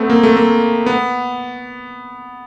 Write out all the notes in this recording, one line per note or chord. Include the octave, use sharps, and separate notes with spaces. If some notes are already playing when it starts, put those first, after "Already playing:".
Already playing: A3 B3 C4
A#3
A3
A#3
B3